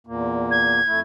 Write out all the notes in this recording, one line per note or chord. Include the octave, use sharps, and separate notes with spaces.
E2 A#2 A#3
G#6
F2 A3 E4